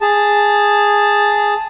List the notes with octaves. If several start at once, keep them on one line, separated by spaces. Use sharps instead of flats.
G#4 A5